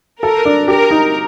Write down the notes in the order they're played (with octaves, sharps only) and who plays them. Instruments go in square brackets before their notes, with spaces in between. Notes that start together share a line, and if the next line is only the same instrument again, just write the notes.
[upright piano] A4 [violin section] A#4
[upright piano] D4
[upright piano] G4 [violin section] A#4
[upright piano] D#4